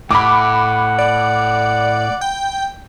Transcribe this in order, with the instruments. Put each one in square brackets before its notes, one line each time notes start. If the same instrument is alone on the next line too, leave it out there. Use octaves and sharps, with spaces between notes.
[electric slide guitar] A2 [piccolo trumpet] F#5 [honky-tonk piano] B5 D6
[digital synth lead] D5
G5